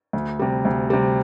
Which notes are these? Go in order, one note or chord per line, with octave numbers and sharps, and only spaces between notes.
D2
C3 G3
D2
C3 G3